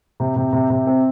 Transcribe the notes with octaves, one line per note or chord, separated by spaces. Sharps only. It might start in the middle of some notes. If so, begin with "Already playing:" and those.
C3
C3
C3
C3
C4